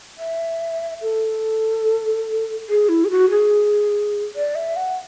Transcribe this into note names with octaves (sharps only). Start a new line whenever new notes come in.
E5
A4
G#4
E4
G#4
F#4
G#4
D5
E5
F#5